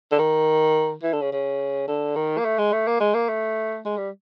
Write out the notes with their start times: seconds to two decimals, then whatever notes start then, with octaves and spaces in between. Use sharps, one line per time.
0.11 D3
0.19 D#3
1.03 E3
1.13 D3
1.22 C#3
1.32 C#3
1.88 D3
2.16 D#3
2.38 A#3
2.45 A3
2.58 G#3
2.73 A3
2.87 A#3
3.00 G#3
3.14 A#3
3.29 A3
3.86 G#3
3.98 G3